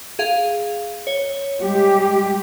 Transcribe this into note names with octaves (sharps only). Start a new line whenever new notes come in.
G#4 F5
C#5
G3 G#3 G4